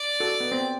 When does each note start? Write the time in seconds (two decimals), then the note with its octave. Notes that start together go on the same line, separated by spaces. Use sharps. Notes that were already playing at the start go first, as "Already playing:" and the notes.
Already playing: D5
0.20 F#4 A4
0.40 B3
0.52 C4